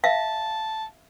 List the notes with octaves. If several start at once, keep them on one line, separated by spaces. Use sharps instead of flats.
E5 F5 A5